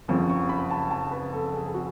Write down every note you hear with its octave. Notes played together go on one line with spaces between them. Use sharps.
F#1 F2 C#3 F3 C#6
C#6
B5
A5
A5
B4
A4
G#4
G#4
F#4